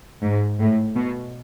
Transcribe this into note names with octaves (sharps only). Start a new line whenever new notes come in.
G#2
A2
B2